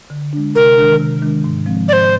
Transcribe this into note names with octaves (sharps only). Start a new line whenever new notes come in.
D3
G#3 D4
C3 A#4
D#3 G#3 D4
C3
D#3 G#3 D4
G#2
F3 G#3 C4
G#2 C5 D5